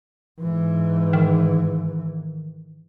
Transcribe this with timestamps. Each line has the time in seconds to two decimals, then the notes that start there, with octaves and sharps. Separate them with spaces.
0.41 G#2 E3
1.13 D#3